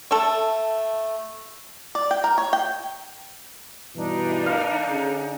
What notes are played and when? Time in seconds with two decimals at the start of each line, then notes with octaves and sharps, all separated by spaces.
0.11 A3 A4
1.95 D5
2.11 G5
2.24 A#4
2.38 C#5
2.53 G5
3.96 G2 B2 E3 D4 D#4
4.46 F5
4.88 D3 C#4 G#4